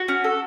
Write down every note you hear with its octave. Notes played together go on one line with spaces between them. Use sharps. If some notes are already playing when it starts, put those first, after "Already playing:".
Already playing: F#4
C#4
A4